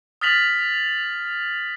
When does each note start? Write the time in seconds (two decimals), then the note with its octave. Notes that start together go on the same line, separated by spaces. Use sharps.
0.21 D#6 F6 A6 B6 F7 F#7